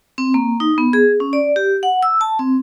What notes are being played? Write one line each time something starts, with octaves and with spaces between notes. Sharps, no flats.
C4
A#3
D#4
B3
G#4
C#4
D5
G4
F#5
E6
A5
C4